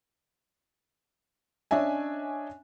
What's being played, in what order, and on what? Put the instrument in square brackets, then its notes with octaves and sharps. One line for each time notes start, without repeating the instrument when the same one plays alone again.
[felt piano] C#4 D4 D#5 E5 G#5